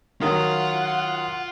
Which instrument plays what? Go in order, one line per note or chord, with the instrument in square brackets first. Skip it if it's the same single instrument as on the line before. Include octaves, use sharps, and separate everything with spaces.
[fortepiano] D#3 F#3 [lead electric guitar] F4 F5 [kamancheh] F#5